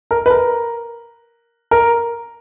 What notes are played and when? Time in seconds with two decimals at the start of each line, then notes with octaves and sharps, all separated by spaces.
0.11 A#4
0.26 B4
0.30 A#4
1.71 A#4